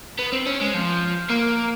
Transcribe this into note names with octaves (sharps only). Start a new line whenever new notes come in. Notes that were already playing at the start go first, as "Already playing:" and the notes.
B3
C4
C#4
G#3
F3
A#3